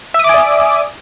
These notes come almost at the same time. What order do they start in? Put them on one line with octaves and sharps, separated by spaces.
E5 D#6 D6 G#5 D5